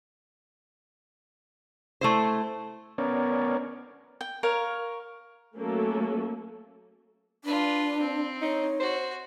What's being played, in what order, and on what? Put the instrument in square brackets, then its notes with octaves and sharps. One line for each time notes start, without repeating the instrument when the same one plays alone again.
[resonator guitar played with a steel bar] A3 E4 C5
[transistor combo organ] B3 C#4 A#4 C#5 D5
[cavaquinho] G5
A#4 C#5 F5
[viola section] F#3 A3 A#3 C#4 A4
[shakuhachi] D4 [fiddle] F4 B4
[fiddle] C4
[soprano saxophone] D#4 [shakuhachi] C#5
[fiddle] F#4 [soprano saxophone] C5